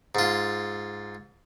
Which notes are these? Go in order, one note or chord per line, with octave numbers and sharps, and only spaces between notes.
G#2 F4